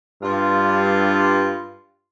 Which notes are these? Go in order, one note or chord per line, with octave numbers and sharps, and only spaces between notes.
G2 F4